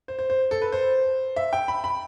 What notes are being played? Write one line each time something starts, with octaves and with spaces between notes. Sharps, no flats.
C5
C5
C5
A4
B4
C5
E5
G5
B5
B5